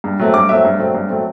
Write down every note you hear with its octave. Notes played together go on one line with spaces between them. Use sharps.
G2
F#3 A3 C4
G2 D6
F#3 A3 C4 E5
G2
F#3 A3 C4
G2
F#3 A3 C4